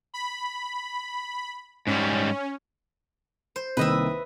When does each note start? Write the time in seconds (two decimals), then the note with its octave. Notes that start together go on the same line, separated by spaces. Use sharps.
0.14 B5
1.87 G#2 G3 C#4
3.56 C5
3.77 C2 D#3 A#3 B4 D#5 E5